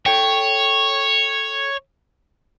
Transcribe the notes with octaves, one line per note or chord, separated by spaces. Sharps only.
A4 C#5 G5